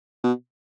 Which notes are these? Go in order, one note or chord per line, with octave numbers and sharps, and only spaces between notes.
B2